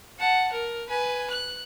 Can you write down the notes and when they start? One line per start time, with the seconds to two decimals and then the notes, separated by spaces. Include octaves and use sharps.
0.19 F#5 A5
0.52 A#4
0.89 B4 G#5
1.30 F#6